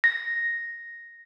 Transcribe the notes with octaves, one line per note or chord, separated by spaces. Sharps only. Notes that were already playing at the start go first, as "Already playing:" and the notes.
A#6